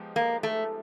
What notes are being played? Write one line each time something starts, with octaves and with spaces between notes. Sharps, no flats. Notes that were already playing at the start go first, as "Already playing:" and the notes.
Already playing: F3 G#3 B3 D#4 G4
A#3
A3